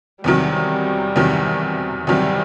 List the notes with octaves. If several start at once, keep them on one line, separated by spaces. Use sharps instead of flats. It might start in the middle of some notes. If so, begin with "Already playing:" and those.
E2 C3 D#3 F#3 G3
E2 C3 D#3 F#3
E2 C3 D#3 F#3 G3